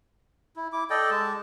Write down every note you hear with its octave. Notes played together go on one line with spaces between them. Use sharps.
E4
E4 D6
A4 D5 D#5 G5
G#3 A5